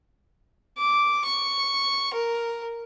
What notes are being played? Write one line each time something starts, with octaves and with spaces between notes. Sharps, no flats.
D6
C#6
A#4